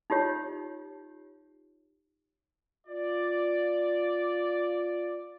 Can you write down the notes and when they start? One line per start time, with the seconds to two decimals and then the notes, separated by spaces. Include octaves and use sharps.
0.10 D#4 F4 G4 C#5
2.87 F4 D5